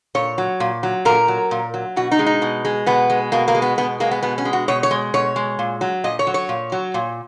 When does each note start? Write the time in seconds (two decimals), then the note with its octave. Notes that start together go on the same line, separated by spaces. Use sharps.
0.15 A#2 C#5
0.38 F#3
0.60 A#2
0.83 F#3
1.05 A#2 A#4
1.28 F#3
1.51 A#2
1.74 F#3
1.96 B2 F#4
2.11 D#4
2.19 G#3
2.26 D#4
2.42 B2
2.65 G#3
2.86 B2 B3
3.10 G#3
3.32 B2 A#3
3.48 A#3
3.55 G#3
3.62 B3
3.78 B2 B3
4.00 G#3 A#3
4.11 B3
4.23 B2 B3
4.38 C#4
4.45 G#3
4.53 F#4
4.68 B2 C#5
4.83 C#5
4.91 G#3
5.14 B2 C#5
5.36 G#3
5.59 A#2
5.81 F#3
6.04 A#2 D#5
6.19 C#5
6.27 F#3
6.34 C#5
6.49 A#2
6.72 F#3
6.94 A#2